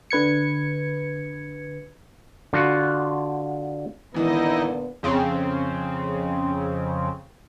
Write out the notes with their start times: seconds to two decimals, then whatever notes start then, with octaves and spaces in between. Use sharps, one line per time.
0.11 D3 B4 G#6 C#7
2.53 D3 F4 F#4 F#5
4.14 G#1 A#2 D3 E3 B3 D#4 E4 D#5
5.03 F2 C#3 C4